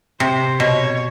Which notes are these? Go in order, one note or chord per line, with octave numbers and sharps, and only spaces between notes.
C3 C5
B2 C#5